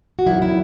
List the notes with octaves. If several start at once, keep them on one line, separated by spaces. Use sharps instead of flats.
F#4
E2 D#3 F#3 E4
E4